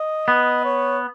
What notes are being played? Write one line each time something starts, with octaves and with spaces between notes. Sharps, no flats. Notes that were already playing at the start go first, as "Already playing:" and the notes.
Already playing: D#5
B3
C#5